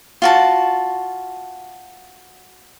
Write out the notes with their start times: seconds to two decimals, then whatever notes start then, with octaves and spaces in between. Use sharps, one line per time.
0.22 F4 F#4 A5